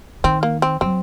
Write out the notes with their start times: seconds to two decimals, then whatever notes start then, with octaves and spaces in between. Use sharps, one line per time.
0.24 D#3 C4
0.43 A#3
0.62 C4
0.81 F#3 C4